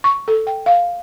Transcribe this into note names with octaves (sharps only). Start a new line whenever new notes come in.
C#6
A4
G5
F5